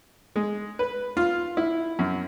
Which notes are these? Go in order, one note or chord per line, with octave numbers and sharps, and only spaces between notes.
G#3
B4
F4
E4
F#2